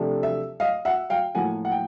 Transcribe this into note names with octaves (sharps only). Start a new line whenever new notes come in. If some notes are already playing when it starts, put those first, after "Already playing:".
Already playing: C3 F3 A3 D4
E5
D#5 F5
E5 F#5
F5 G5
A2 F3 A#3 F#5 G#5
F#5
G5